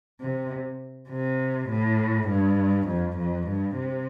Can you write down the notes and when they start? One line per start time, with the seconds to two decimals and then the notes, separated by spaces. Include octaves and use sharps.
0.20 C3
1.10 C3
1.69 A2
2.28 G2
2.88 F2
3.17 F2
3.48 G2
3.77 C3